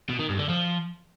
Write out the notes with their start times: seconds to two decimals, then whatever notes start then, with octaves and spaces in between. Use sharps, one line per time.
0.09 B2
0.19 D#3
0.29 G2
0.39 D3
0.49 F3